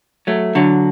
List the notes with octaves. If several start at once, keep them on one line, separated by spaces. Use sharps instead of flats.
F#3 A3
D3 F#3